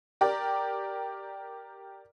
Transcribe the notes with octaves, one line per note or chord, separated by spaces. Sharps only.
G4 A#4 D5